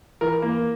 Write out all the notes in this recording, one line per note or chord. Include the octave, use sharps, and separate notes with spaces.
E3 A#4
A#3